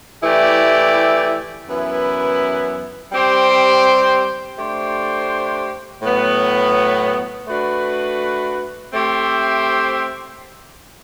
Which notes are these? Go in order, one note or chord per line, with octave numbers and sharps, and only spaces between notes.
E3 A3 E4 G4 D5
F#2 E3 B3 E4
G3 C4 G4 C5
A3 D4 G4 C5
A2 F#3 B3
A3 D4 F#4 B4
A3 C4 G4 C5 E5